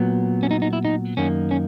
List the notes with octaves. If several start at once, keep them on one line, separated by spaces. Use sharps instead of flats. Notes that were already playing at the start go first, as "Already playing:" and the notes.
Already playing: A#2 F#3 B3
C#4
D#4
D#4
E4
D#4
F#2 D#3 A#3 C#4
C#4